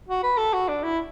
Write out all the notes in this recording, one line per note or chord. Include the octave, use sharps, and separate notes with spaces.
F#4
B4
A4
F#4
D4
E4